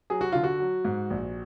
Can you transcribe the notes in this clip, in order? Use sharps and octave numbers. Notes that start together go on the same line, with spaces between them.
F#3 G#4
F#4
D3 F4
F#4
F#3
G#2
A#1